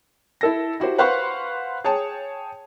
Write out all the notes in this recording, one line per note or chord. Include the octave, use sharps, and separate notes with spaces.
E4 A4 A#6
E4 F#4 G4 C5
B4 C5 F5 F#5 C6 C#6
G#4 C#5 G5 A5